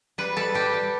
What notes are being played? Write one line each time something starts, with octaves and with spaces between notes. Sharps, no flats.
G3 B4
G3 A4
G3 G4
G3